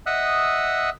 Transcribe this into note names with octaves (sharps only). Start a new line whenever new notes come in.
D#5 E5 F#5 D#6 E6 F#6